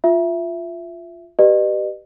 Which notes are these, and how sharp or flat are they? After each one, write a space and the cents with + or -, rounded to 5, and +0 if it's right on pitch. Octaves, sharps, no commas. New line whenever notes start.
F4 +0 E5 +10
G4 -15 B4 +0 D#5 -40